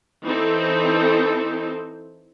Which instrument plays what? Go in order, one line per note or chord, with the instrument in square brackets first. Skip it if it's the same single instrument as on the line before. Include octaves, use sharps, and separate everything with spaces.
[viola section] E3 C4 D#4 A4 C5